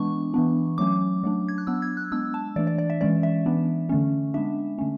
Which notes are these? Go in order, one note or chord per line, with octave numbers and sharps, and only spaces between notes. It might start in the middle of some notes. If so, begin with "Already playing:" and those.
Already playing: E3 G#3 B3 D4 C#6
E3 B3 D4
F#3 A3 C#4 D6
F#3 A3 D4
G#6
F#6
F#3 B3 D4 E6
G#6
F#6
G#3 B3 D4 E6
A5
E3 A3 D4 D5
D5
D5
E5
E3 G#3 C#4 D5
E5
E3 B3 D4
D3 A3 C#4
G#3 B3 D4 E5
D3 A3 C#4